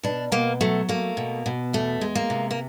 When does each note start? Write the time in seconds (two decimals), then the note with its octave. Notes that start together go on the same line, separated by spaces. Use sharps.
0.03 B2 D4
0.32 B2 A#3
0.61 F#3 A3
0.89 A3 A#3
1.17 B2
1.46 B2
1.73 E2 A3
2.01 G#3
2.15 A#3
2.30 C3
2.51 A#3